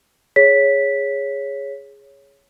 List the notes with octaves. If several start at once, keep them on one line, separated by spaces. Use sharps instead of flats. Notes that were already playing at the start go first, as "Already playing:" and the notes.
G#4 C#5 B6